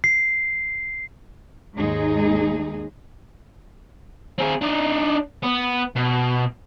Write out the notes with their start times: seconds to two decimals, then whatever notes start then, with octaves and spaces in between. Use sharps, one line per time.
0.04 C7
1.78 D#2 G#2 G#3 D#4 G#4
4.39 C4 G#4
4.62 D4 D#4
5.43 B3
5.96 B2